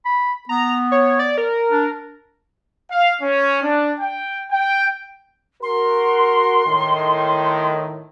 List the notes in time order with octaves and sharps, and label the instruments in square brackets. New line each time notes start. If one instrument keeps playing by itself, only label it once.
[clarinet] B5
[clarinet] B3 [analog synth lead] A#5
[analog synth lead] C#5
D5
A#4
[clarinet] D4
[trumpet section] F5
C#4
D4
G5
G5
[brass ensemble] F#4 A#4 [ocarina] C6
[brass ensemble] A2 D#3